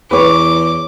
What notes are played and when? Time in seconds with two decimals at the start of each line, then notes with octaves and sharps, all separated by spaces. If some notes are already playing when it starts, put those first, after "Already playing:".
0.11 E2 B4 C#5 D6